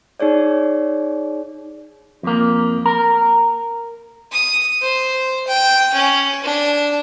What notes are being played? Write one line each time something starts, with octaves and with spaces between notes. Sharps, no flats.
D#4 G#4 C#5 D5
F2 A#3
A#4
D#6
C5
G5
C#4
D4